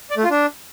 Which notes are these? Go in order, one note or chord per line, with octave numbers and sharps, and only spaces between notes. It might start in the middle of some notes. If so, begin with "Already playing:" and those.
D5
A3
F4
D4